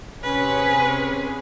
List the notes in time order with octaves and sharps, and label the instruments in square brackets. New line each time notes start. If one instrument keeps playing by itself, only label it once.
[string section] C3 C#4 G#4 [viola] B4